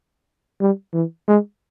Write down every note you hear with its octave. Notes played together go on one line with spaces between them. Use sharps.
G3
E3
G#3